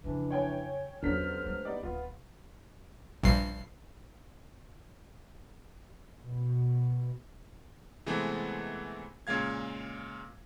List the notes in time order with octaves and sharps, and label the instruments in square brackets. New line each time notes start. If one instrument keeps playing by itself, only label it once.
[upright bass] F2 C#3 [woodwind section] E3 F3 D4
[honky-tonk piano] C#5 G5 G#5
[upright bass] E2 C#4 [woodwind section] G2 C5 F6 [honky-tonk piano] D3 F#3 B6
[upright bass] G#3 A3
[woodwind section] B3 G4 [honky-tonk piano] D#4 D5
[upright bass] D1 [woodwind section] B3 [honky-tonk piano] F4
[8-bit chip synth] A#1 G2 C7
[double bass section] B2
[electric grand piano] C3 E3 G#3 A3 B3 C4
A#2 C#3 G#3 F5 G#6